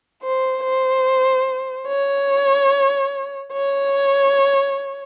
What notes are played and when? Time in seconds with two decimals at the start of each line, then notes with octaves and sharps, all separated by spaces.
0.23 C5
0.64 C5
1.87 C#5
3.53 C#5